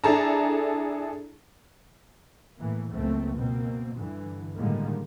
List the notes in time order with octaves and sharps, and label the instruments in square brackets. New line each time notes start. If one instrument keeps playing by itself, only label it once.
[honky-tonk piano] D4 E4 G#4 A4 A5 A#5
[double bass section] A2 E3 A#3
F#1 C#2 A3 A#3 C4
B2 A#3 C4
G2 D3 E3
A2 D3 D#3 G3 G#3 A#3